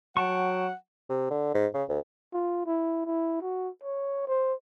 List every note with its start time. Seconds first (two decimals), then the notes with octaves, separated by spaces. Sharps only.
0.17 F#3 F#5 G5 A5 C#6
1.10 C3
1.30 D3
1.54 G#2
1.74 C#3
1.89 D2
2.33 F4
2.66 E4
3.06 E4
3.42 F#4
3.83 C#5
4.28 C5